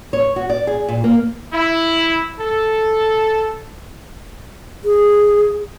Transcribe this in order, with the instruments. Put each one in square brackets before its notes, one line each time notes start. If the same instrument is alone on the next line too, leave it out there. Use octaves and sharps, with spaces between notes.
[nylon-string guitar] C#5
F#4
D5
G#4
A#2
A#3
[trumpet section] E4
A4
[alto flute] G#4